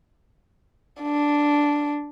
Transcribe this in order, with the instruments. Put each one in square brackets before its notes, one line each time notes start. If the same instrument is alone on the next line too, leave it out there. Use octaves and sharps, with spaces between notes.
[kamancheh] D4